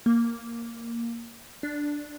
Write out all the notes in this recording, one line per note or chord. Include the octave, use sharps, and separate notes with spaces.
A#3
D4